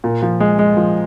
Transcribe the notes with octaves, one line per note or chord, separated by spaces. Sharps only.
A#2
F3
G#3
G#3
F3